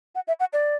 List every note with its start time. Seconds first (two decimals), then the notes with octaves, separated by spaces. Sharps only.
0.15 F#5
0.28 E5
0.40 F#5
0.53 D5